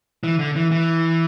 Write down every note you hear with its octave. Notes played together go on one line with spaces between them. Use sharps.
E3
D3
E3
E3